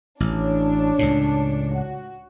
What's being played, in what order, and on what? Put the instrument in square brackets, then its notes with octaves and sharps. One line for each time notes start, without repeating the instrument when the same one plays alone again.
[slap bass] A1 [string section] D4 C#5
[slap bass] C#2 A2
[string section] F#4